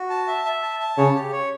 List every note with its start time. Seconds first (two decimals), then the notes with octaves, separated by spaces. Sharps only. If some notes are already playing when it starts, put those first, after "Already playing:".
Already playing: F#4
0.10 A5
0.28 E5
0.45 E5
0.62 A5
0.80 A5
0.97 C#3 C#5
1.15 G4
1.32 C#5